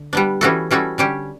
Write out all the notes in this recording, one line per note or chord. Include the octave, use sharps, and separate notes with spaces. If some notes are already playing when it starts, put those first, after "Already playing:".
Already playing: D3
G3 B3 D4
E3 G3 C#4 F#4 A4
E3 G3 C#4 F#4 A4
D3 G3 C#4 G4